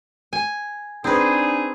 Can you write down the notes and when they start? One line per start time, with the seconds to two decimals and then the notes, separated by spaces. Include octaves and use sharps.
0.33 G#5
1.04 C4 D4 D#4 G#4 B4